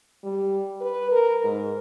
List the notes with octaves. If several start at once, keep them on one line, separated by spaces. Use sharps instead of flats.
G3
B4
A#4
G#2